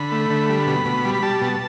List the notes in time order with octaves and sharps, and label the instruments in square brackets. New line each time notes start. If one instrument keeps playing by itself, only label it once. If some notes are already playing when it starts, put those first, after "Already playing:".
Already playing: [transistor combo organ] D3 B5
A3
D3
G3
B2
B2
G3
B5
G3 A5
B2